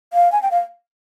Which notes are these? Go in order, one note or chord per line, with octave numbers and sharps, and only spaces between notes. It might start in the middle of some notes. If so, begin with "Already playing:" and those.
F5
G#5
G5
F5